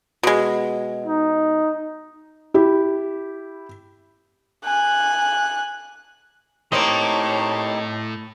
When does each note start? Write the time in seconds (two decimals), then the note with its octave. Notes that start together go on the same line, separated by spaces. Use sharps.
0.23 B2 G#3
1.06 D#4
2.54 E4 G4
4.64 G#5 F#6
6.72 A2 A#3 C4 D#4 G4 C#5 D#5 A5